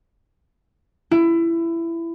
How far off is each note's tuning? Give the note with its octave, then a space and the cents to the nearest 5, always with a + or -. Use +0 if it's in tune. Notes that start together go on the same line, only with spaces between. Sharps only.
E4 +20